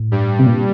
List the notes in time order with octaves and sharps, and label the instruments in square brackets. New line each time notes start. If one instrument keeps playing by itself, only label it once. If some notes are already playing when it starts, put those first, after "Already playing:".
Already playing: [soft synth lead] A2
[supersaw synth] G2 G3
[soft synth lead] C3
A#2